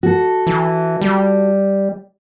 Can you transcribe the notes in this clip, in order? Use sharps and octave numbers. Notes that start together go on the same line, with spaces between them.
F#4 A4
E3
G3